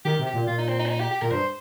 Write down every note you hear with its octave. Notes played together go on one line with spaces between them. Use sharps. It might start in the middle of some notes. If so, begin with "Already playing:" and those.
D#3 G4
C3
G4
A#2
A#2 F4
D#4
C4
D#4
C4
D#4
G4
G4
A#2 A#4
G2 C5